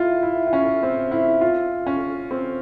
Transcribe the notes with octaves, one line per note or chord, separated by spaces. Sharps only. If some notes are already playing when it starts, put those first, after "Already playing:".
Already playing: E4 F4
E4
E4
C#4
C4
E4
F4
C#4
C4